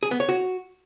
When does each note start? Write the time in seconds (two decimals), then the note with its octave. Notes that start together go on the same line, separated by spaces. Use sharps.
0.03 G#4
0.11 B3
0.20 C#5
0.29 F#4